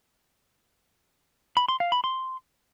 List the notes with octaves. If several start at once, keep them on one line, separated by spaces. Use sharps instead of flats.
B5
C6
F5
B5
C6